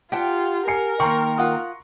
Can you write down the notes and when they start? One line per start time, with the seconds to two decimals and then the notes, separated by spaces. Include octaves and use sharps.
0.12 F4 G4 F#5 G5 A5
0.67 A#4 G#5 C7 C#7
1.00 D#3 A#3 A#5 C6 C#6
1.38 F4 F#5 D#6